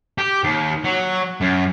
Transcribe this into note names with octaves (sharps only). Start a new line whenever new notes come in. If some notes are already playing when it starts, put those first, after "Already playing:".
G4
D#2
F#3
F#2